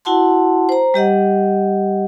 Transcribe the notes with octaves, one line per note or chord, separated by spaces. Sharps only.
E4 F#4 F#5 A5 C6
C5 A#5
G3 G4 D#5 F#5